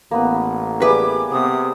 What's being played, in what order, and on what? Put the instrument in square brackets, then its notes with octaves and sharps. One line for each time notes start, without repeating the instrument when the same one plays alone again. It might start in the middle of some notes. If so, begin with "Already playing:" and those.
[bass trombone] A1 [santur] A#3 B3 B4
[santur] G3 G#4 E5 [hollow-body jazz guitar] B4 [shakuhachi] D6
[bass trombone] C3 [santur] B3 [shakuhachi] D#6